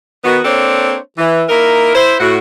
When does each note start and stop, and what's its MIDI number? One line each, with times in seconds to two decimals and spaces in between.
0.24 0.39 51
0.24 0.39 59
0.24 0.39 66
0.44 0.96 58
0.44 0.96 60
0.44 0.96 62
0.44 0.96 69
0.44 0.96 72
0.44 0.96 73
1.18 1.42 52
1.49 1.93 58
1.49 1.93 63
1.49 1.93 64
1.49 1.93 70
1.95 2.16 64
1.95 2.16 72
2.20 2.38 45
2.20 2.38 66